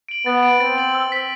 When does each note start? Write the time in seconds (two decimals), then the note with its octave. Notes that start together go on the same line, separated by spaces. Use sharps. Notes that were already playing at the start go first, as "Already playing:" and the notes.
0.09 D7 F#7
0.26 B3 A6
0.43 D7 F#7
0.60 C4 A6
0.78 D7 F#7
0.95 E6
1.12 B6 F#7